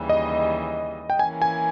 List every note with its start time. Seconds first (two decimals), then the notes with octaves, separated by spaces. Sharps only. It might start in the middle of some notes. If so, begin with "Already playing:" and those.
Already playing: D#2 C#3 E3 G3
0.09 D#5
1.10 G5
1.19 E3 A#3 C#4 G#5
1.42 G#5